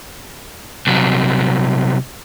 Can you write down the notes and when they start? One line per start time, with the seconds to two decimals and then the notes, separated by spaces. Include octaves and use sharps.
0.87 C2 F#3